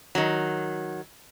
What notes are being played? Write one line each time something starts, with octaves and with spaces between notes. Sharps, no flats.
D#3 F#3